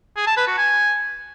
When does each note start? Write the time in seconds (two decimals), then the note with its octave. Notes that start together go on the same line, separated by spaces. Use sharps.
0.16 G#4
0.27 A5
0.37 B4
0.47 F#4
0.58 G#5